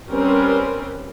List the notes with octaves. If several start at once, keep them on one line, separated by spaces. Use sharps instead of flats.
G3 C4 C#4 A#4 B4